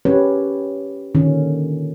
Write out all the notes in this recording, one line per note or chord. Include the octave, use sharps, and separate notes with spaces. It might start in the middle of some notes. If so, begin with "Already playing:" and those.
C#4 G4 B4 C#5
A#2 D3 D#3 C#4